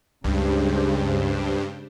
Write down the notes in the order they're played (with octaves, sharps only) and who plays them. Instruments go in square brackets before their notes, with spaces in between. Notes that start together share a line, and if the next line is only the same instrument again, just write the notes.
[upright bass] C#2 [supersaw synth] G2 [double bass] C#3 G#3 [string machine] D4 G4 C5